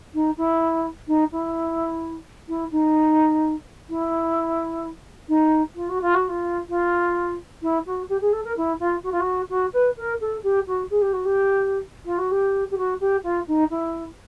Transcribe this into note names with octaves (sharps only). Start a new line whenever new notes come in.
D#4
E4
D#4
E4
E4
D#4
E4
D#4
F4
F#4
F4
F#4
F4
F4
E4
F#4
G4
G#4
A4
A#4
E4
F4
F#4
F4
F#4
F#4
B4
A#4
A4
G4
F#4
G#4
G4
F#4
G4
F4
F#4
G4
G4
F#4
G4
F4
D#4
E4